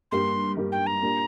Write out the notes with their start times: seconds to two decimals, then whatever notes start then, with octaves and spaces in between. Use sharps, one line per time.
0.11 G2 G3 A#3 G4 C6
0.57 G2 G3 A#3 G4
0.72 G5
0.87 A#5
1.02 A#2 A#3 D4 G4